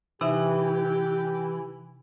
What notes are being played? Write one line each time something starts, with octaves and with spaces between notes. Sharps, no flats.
C3 E3 D#4 G4 E5